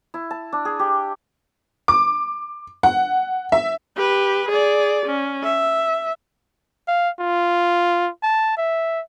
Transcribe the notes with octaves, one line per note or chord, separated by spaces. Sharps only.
E4
A5
D4
G#4
G4
D6
F#5
E5
G4 B4
G#4 D5
C#4
E5
F5
F4
A5
E5